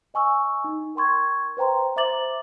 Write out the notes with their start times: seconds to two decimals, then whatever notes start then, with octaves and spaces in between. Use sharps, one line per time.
0.14 D#5 G#5 C#6 E6
0.64 D#4
0.95 A#4 G5 C6 C#6 G#6
1.57 B4 C5 G5 A#5 C6
1.96 C5 E5 A#5 D6 A6 F#7